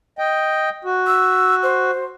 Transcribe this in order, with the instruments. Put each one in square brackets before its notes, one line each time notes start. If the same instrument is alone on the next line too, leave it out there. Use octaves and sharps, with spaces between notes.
[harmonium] D#5 G5
F#4
[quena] E6
C5